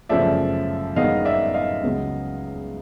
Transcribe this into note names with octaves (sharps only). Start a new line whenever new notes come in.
G1 F#2 C#3 F3 A3 D5 E5
G1 F#2 D#3 G#3 B3 D#5 F5
D5 E5
D#5 F5
C#2 C#3 F#3 B3